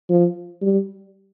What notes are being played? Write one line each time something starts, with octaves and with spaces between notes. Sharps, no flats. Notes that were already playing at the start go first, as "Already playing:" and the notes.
F3
G3